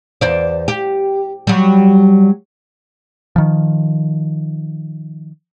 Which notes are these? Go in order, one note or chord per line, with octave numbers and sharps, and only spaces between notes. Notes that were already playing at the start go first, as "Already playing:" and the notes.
E2 C5 D5
G4
F#3 G3
D#3 F3